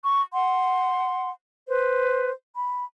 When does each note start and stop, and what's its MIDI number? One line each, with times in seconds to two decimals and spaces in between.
0.03 0.23 85
0.33 1.29 78
0.33 1.29 84
1.67 2.31 71
1.67 2.31 72
2.55 2.85 83